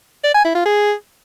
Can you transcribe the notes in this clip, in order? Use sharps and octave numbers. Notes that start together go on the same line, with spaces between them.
D5
G#5
E4
F4
G#4